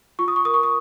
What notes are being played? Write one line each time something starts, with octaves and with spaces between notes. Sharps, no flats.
F4 C#6
D#6
C#6
A#4 D#6
C#6
D#6